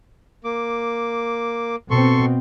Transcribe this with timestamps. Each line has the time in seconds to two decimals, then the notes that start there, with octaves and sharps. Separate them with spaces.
0.44 A#3 D6
1.91 B2 C4 A4 C6 C#6